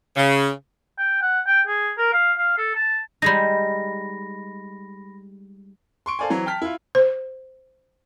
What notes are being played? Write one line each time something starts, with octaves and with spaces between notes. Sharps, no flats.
C#3
G5
F#5
G5
G#4
A#4
F5
F5
A4
A5
G3 G#3 D#4 B5 A#6
C6 C#6 D7
A4 C5 D5 F5 G#5
E3 F#3 C4
G5 A5 F6 B6
E4 F4
C5